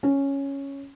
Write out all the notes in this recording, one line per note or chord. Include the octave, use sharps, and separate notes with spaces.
C#4